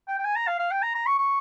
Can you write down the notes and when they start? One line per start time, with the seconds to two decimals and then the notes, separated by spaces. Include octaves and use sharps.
0.08 G5
0.19 G5
0.25 G#5
0.36 A#5
0.48 F5
0.60 F5
0.71 G5
0.83 A#5
0.95 A#5
1.07 C#6
1.19 C#6